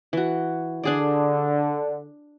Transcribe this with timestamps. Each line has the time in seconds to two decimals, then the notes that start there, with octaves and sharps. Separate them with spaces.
0.13 E3 F#4
0.83 D3 D4 G#4 D5